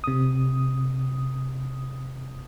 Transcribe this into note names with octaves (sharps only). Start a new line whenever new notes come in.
C3 D#6